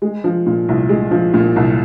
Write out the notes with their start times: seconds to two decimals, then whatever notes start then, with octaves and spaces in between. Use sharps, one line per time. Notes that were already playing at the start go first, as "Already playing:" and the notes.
0.02 G#3
0.24 F3
0.46 A#2
0.69 C2
0.89 G#3
1.11 F3
1.34 A#2
1.56 C2